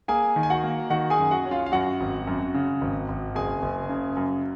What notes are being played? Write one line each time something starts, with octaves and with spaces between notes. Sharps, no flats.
A#3 G#4 G#5
D#3
G#5
F#4 F#5
A#3
D#3 F#4 F#5
G#4 G#5
F#2
F#4 F#5
C#4
F4 F5
F5
F#2 F#4 F#5
G#1
F#2
C#3
G#1
G#1
F#1 G#4 G#5
F#1
C#3
F#2